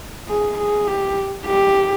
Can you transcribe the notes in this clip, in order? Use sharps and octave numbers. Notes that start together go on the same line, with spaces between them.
G#4
G#4
G4
G4